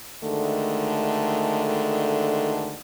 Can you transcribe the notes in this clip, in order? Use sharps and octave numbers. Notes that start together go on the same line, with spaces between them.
D2 D3 D#3 G#3 A3